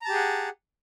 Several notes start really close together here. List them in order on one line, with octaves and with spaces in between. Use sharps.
A#5 A5 G4 G#4 F#5